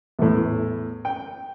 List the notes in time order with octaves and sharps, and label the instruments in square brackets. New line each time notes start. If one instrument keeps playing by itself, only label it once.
[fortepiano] E2 A2
G5